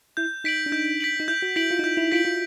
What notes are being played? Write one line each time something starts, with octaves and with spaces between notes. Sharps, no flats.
E4 G6
D#4 B6 D7 F#7
D4
D#4 G6
B6 D7 F#7
D#4
E4 G6
F#4
E4 B6 D7 F#7
F4
D#4
E4 G6
E4
F4 B6 D7 F#7
F4